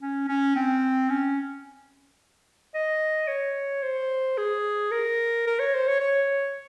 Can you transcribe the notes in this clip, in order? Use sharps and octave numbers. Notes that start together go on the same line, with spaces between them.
C#4
C#4
C4
C#4
D#5
C#5
C5
G#4
A#4
A#4
C#5
C5
C#5
C#5